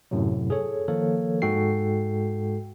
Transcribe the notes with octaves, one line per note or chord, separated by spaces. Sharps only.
F#2 A2 C3 F#3
G#4 A4 C#5
D#3 F3 A#3 A4 A#4 C#5
G#2 G#3 F#4 A4 G5 C7